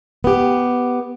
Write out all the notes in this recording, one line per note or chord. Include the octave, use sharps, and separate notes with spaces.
B3 G4